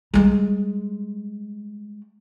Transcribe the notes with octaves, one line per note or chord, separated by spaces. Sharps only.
G3 G#3